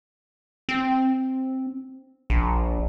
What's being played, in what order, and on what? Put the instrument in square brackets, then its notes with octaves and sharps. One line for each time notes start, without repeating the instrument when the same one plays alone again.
[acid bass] C4
A#1